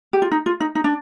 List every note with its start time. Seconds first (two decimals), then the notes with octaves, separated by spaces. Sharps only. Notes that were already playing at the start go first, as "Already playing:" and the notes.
0.13 G4
0.22 F4
0.32 D#4
0.46 F4
0.60 D#4
0.75 D#4
0.84 D4